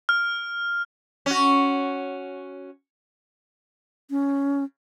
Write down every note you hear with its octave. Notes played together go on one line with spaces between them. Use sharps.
F6
C#4 F#4
C#4